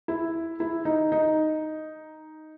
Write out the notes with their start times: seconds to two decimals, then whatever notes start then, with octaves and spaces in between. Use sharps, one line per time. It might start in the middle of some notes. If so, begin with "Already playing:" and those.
0.08 E4
0.60 E4
0.85 D#4
1.12 D#4